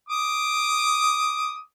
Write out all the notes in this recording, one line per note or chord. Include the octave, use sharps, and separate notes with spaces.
D6 D#6